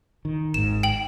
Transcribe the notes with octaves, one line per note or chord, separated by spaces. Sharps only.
D#3
G#1 G#2 E7
G5 F#7